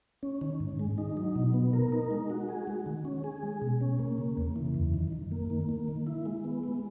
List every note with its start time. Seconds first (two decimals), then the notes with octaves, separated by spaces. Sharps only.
0.23 C#4
0.41 D#3
0.60 G#2
0.79 G#3
0.98 D#4
1.17 F#3
1.36 B2
1.54 B3
1.73 A#4
1.92 D#4
2.11 G#3
2.30 F#4
2.49 G#4
2.67 G#3
2.86 D#3
3.05 C#4
3.24 G#4
3.43 G#3
3.62 B2
3.81 C#4
3.99 A#3
4.18 C#3
4.37 E2
4.56 E3
4.74 F#2
4.94 D#3
5.12 F#2
5.32 A#3
5.50 D#3
5.69 A#3
5.88 D#3
6.07 E4
6.26 G#3
6.44 B3
6.63 G#3